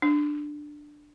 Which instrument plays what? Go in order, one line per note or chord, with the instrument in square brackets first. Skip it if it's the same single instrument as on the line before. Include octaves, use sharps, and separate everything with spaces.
[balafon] D4